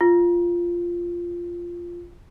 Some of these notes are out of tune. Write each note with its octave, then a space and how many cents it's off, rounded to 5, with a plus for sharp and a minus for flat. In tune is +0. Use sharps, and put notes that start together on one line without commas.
F4 -5